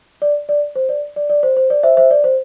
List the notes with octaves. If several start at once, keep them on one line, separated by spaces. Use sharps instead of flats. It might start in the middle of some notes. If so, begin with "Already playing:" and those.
D5
D5
C5
D5
D5
D5
C5
C5
D5
C5 E5
C5 E5
D5
C5